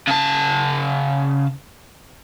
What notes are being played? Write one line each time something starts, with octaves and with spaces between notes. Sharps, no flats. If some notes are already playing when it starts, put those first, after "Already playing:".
C#3 A5